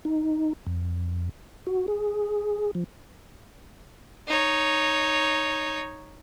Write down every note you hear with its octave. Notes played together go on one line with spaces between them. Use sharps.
D#4
F2
F#4
G#4
F3
D#4 C#5